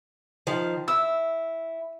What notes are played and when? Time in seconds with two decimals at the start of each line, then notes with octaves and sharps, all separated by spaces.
0.47 D#3 F3
0.88 E4 E6